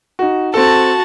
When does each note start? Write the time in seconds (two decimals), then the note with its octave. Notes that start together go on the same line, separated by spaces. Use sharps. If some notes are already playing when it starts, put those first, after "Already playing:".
0.19 D#4 F#4
0.54 C4 F#4 A4 A5